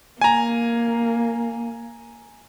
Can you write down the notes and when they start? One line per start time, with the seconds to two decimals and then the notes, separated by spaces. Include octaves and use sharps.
0.21 A#3 G#5 A#5